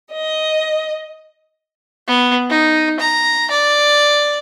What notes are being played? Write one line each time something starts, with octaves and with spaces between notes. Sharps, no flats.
D#5
B3
D#4
A#5
D5